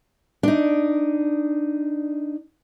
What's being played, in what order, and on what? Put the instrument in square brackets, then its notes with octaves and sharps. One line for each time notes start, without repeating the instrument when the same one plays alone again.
[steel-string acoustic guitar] D4 D#4